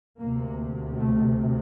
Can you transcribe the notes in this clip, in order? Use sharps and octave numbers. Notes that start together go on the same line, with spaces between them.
D2 C3 A#3
A3